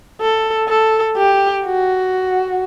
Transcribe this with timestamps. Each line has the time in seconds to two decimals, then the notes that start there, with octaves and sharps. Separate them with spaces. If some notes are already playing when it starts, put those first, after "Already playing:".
0.21 A4
0.69 A4
1.16 G4
1.65 F#4